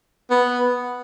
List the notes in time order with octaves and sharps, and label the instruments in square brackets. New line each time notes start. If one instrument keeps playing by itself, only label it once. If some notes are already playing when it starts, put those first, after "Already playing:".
[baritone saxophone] B3